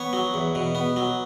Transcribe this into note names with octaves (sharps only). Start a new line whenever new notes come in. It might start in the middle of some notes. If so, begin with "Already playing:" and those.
Already playing: B3 C#5
F#3
E2
B2
B3
F#3